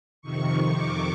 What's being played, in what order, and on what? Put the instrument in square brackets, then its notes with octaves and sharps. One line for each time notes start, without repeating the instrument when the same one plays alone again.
[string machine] F2 C3 D#3 C#6
D6